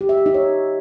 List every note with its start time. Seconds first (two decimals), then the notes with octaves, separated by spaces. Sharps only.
0.01 G4
0.09 E5
0.17 G4
0.26 D#4
0.34 C#5